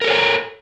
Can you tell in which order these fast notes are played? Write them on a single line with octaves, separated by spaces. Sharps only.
A#4 A4 C#5 G#5 A#5